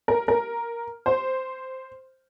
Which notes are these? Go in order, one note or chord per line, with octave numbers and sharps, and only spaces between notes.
A#4
A#4
C5